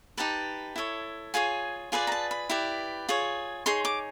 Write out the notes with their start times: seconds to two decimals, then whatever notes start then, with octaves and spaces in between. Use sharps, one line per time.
0.17 D#4 G4 B4 A5
0.76 E4 A4 C#5
1.34 F4 G#4 C#5 G#5
1.92 F4 G#4 B4 D5 G#5
2.07 A#5
2.12 A5
2.31 B5
2.49 E4 G4 B4 D5
3.09 F4 G#4 C#5
3.66 D#4 G#4 C#5 C6
3.85 D6